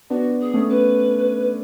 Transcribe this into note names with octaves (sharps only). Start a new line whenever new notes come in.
B3 D4 F#4
G#4
A3 C#4
B4